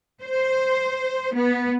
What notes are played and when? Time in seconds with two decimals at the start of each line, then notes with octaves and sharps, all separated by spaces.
0.22 C5
1.35 B3